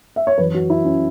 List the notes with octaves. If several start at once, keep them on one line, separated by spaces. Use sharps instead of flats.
E5
C#5
F#2 E3 B4
F#4
E4
C#4